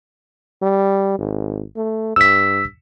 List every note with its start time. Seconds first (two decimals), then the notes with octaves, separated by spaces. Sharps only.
0.62 G3
1.18 G#1
1.76 A3
2.16 G2 E6 B6